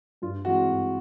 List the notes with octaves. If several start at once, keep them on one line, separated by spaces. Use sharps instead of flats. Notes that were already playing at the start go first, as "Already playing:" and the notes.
G2 F4
E3 G#3 C4 F#4
G2